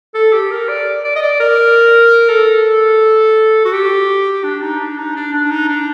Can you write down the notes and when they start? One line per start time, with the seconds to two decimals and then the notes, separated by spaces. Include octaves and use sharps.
0.14 A4
0.33 G4
0.51 A#4
0.68 D5
1.04 D5
1.16 D#5
1.22 D5
1.40 A#4
2.29 A4
3.65 F#4
3.73 G4
4.44 D4
4.62 D#4
4.79 D4
4.98 D#4
5.15 D4
5.33 D4
5.51 D#4
5.69 D4